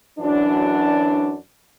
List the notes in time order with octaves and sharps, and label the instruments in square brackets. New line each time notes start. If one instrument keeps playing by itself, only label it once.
[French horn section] F#2 E3 F#3 D4